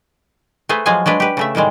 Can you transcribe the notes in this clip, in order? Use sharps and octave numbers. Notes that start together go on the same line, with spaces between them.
A3 G#4 B4 C5
F3 F#3 G#3 G#4 F5 G#5
F#3 G#3 D4 B4
G4 B4
C#3 A3 E5
A2 D#3 G3 G#3